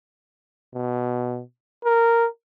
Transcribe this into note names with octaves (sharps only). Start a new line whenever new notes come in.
B2
A#4